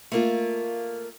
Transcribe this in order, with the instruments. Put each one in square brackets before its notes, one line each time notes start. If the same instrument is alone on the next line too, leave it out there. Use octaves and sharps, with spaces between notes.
[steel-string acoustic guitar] A3 A#3 F4